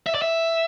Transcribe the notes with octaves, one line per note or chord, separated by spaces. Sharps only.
E5
D5
E5